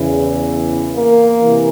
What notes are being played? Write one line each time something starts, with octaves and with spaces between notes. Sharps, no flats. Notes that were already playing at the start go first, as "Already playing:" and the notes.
Already playing: E2 C#3 E3
A#3
C3 E3